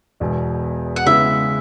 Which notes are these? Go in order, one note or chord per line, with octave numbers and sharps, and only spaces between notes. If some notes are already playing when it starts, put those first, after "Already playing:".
E1 E2 B2
F#5
C#3 G#3 B3 E4 B4 E5